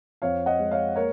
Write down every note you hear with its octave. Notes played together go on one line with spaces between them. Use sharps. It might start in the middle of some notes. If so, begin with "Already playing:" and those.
F2 C#5 F5
D#5 F#5
G#3
C#5 F5
A#3 A#4 C#5